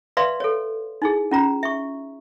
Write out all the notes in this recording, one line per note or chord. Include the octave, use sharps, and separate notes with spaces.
B4 D5 E5 F5 C6
A4 C#5
D#4 E4 G#4
C#4 F4 A#5
E5 C#6